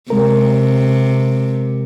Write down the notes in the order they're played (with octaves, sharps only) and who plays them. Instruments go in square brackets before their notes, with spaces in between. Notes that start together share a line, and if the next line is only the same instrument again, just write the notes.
[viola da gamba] C3 [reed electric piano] G#3 A#4